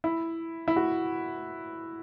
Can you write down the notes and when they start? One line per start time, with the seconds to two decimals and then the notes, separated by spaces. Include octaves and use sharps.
0.04 E4
0.68 E4
0.76 F#4